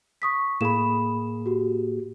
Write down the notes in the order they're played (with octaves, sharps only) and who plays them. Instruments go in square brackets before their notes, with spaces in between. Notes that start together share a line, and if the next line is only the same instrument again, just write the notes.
[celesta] C#6 D#6 B6
[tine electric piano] A2 A#3 G#4 [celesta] B5 E7
[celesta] F#4 G4